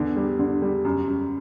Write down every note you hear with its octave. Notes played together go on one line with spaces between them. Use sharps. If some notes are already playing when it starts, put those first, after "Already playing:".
Already playing: E2 D3
G3
D3
G3
F#2
F#2